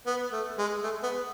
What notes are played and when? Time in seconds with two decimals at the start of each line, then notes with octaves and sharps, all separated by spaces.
0.06 B3
0.32 A3
0.58 G#3
0.83 A3
1.03 B3